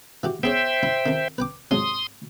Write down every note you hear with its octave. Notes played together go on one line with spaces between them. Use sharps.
E3 F#4 G4
B3 G#4 C5 C#5 E5 G5
E4
F2 D#3
B4 G5 D6
F2 G#2 F#3 C6 D#6